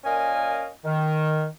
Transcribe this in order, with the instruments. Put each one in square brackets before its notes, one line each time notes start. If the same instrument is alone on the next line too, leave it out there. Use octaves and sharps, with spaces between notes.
[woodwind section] A#2 C#4 A#4 D#5 F5 G#5
D#3